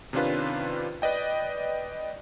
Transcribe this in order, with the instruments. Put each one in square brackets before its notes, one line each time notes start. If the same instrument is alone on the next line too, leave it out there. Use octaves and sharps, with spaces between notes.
[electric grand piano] C3 D#3 C#4 D4 F4 B4
B4 D5 D#5 G5